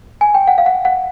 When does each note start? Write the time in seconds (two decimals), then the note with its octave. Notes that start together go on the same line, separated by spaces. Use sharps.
0.21 G#5
0.34 G5
0.47 F#5
0.58 F5
0.66 F#5
0.85 F#5